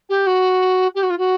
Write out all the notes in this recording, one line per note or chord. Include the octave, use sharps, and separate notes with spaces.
G4
F#4
G4
F#4
F4
F#4